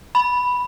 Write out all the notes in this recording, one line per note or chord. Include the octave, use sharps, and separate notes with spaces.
B5